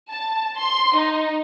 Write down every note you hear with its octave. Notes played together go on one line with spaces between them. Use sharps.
A5
C6
D#4